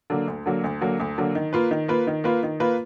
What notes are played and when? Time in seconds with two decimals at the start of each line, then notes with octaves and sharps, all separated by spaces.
0.10 D3 F#3 A#3
0.27 D2
0.46 D3 F#3 A#3
0.64 D2
0.81 D3 F#3 A#3
1.00 D2
1.18 D3 F#3 A#3
1.35 D#3
1.53 A#3 F4 B4
1.71 D#3
1.88 A#3 F4 B4
2.07 D#3
2.24 A#3 F4 B4
2.43 D#3
2.60 A#3 F4 B4